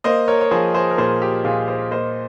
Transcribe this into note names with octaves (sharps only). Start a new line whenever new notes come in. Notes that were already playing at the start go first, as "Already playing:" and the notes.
A#3 C5 D#5
A#4 C#5
C#5
F3 G#4 C5
G#4 C5
A#4
A#2 G#4 C5
G4
A#2 F4 G#4
G#4 C5
A#3 C5 D#5